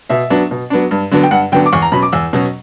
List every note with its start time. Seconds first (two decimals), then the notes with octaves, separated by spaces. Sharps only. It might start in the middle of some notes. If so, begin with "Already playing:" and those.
0.10 B2 E5
0.30 F#3 B3 D4
0.51 B2
0.70 F#3 B3 D4
0.91 G2
1.11 D3 F#3 B3 D4
1.23 G5
1.31 G2 F#5
1.52 D3 F#3 B3 D4 G5
1.66 D6
1.72 E2 C#6
1.82 A#5
1.92 B2 F#3 C#4 B5
2.02 D6
2.12 E2 E6
2.33 B2 F#3 C#4